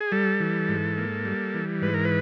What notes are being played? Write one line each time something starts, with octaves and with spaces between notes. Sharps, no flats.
G#4
G3 A4
E3
G#2
A#3
G3
E3
G#2 B4
A#4
B4